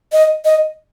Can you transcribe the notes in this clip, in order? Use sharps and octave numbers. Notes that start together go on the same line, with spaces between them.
D#5
D#5